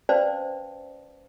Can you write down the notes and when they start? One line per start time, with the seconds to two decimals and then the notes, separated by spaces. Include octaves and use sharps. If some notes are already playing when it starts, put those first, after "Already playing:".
0.09 C#4 B4 C5 D5 F5 A5